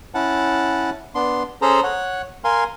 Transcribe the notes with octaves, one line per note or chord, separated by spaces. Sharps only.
C#4 E4 F#5 A5
B3 D4 C6
C#4 G#4 A4 C5 A#5
C#5 F#5
A#4 F5 G#5 C6